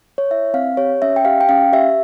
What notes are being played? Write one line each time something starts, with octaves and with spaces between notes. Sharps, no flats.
C#5
E4 E5
C4 F5
G4 C#5
C#4 E5
G5
G4 F5
G5
C#4 F5
G4 E5